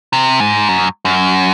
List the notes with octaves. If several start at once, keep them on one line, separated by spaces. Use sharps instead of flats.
C3
G#2
F#2
F#2